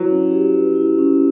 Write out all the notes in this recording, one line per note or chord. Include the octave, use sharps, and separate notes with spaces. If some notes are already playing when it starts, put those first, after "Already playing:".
Already playing: F#3 E4 B4
C#4
G4
B4
E4
C#4